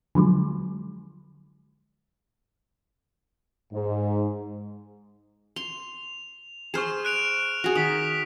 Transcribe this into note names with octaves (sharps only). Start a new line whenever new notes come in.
D3 F3 F#3 G#3
G#2
C6 F7
G#4 C5 C#6 F6 E7
F#6 D7 F7
F#4 G#4
D#3 D#6 B6